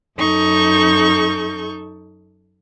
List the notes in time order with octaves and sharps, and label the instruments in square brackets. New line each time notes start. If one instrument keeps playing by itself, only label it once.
[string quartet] F#2 D#4 A4 C#6 G6